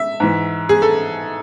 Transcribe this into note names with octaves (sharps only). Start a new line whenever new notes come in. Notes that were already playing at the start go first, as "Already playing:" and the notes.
Already playing: E5
G#2 E3
G#4
A4